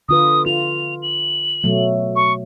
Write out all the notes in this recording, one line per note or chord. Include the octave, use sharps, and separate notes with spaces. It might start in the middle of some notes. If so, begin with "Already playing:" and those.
D3 F4 B4 D#6
F4 F7
F#7
B2 F#3 A3
C#6